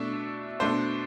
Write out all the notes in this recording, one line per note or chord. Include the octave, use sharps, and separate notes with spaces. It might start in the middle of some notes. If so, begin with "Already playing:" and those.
Already playing: B2 A3 D4 E5
B2 A3 D4 C5